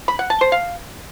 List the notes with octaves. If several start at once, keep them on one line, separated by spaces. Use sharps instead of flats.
B5
F#5
A5
C5
F5